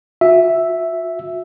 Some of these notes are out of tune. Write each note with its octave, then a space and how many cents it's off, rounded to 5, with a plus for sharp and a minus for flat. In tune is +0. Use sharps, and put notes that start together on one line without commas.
F#4 -45 E5 +0